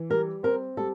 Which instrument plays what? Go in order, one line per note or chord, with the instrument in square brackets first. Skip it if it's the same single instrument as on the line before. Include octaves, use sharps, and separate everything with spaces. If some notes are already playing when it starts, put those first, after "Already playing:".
Already playing: [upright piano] E3
[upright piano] G3 [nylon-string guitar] A#4
[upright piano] C4 [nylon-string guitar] A#4
[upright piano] G3 [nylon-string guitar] A4